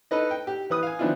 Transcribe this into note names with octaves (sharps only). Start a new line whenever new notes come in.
D#4 A4 B4 D#5
G5
G4
E3 B4 D#6
F5 G#5
D#3 F3 B3 D4 E4 F4